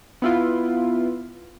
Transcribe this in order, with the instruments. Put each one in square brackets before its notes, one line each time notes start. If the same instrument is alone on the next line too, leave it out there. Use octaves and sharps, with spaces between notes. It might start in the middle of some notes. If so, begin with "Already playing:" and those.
[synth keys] B3 E4 F4